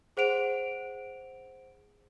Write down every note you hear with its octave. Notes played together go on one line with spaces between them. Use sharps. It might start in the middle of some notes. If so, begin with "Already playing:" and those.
G#4 C5 F#5 D7 F7